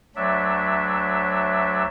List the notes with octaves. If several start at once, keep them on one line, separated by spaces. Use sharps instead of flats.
D2 F#3 D4 E5